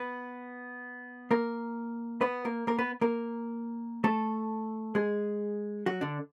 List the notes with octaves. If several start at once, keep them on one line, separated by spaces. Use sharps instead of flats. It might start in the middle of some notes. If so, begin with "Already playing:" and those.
Already playing: B3 B4
A#3 A#4
B3 B4
A#3 A#4
A#3 A#4
B3 B4
A#3 A#4
A3 A4
G#3 G#4
F#3 F#4
D3 D4